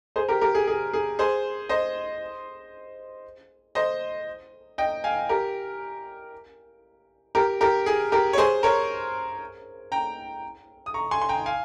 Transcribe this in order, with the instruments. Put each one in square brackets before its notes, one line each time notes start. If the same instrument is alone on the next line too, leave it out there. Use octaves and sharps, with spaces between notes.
[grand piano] G#4 C5
G4 A#4
G4 A#4
G#4
G#4
G#4
G#4 C5
C5 D#5
C5 D#5
D#5 G5
F5 G#5
G4 A#4
G4 A#4
G4 A#4
G#4
G4 A#4
C#5
G#4 C5
A#4 C#5
G5 A#5
D#6
A#5 C#6
G#5 C6
C6
G5 A#5
F5 G#5